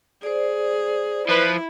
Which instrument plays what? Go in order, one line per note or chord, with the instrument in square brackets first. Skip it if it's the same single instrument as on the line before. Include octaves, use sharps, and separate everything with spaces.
[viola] G#4 [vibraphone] C5 D5
[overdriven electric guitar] F3 [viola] E4 [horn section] B4